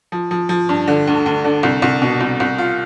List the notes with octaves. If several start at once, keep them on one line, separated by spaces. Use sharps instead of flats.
F3
F3
F3
G2
D3
D2
D2
D3
C2
C2
B2
C2
C2
F4